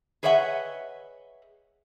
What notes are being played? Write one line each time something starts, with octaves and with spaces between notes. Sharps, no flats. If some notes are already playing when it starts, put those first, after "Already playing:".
G#4 B4 C#5 D#5 E5 F#5